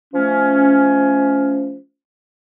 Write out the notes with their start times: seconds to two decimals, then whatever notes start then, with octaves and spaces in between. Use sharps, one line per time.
0.14 F3 A3 C#4